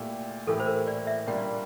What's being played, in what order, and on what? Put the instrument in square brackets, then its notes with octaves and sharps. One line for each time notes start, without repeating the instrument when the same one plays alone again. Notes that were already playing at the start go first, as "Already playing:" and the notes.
Already playing: [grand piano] A#2 A3 E4 G4
[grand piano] A2 E3 A#3 E4 G4 [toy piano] A4
[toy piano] C5
A#4
D5
E5
[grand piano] A#2 G3 A#3 D4 [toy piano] G5